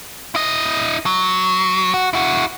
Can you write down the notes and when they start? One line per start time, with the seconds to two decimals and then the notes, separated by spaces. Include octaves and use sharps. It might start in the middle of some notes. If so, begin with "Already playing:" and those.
0.35 E4 D#5
1.06 F#3
1.94 F#4
2.13 E4 F#4